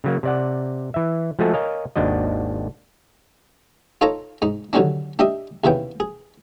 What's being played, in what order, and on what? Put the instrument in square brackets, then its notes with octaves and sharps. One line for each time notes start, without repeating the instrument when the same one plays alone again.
[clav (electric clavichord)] C#3 F#3 A#3
C3 D5 F#5
E3 E5
F3 G#3 A3 F#4 G#4 A4
A#4 C#5 D#5 F5 G#5
G#1 D#2 D4 F#4 D#5
[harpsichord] D#4 F4 A4 C#5 A5 A#5
G#2 D#4
D3 D#3 F#3 G3 C#4 D4
D4 G4 D#5 E5 D#6
D#2 C#3 E3 B3 G5
G#4